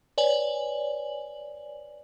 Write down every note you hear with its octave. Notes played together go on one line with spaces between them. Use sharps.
B4 C#5 D5 G#5 F#7